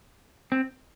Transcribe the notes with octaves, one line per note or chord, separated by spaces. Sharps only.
C4